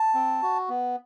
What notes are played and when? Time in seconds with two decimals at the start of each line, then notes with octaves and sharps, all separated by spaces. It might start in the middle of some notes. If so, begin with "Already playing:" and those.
Already playing: A5
0.14 C4
0.42 F#4
0.69 B3